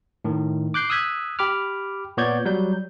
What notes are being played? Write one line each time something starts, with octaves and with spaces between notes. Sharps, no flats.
A2 D#3
D6 F#6 G6 C7
D#6 E6 F#6 G#6 B6
G4 B5 D6 F6
A#2 B3 C#5 D5 G6 G#6
F#3 G3 G6